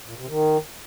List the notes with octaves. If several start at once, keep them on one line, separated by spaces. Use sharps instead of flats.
A#2
C3
D#3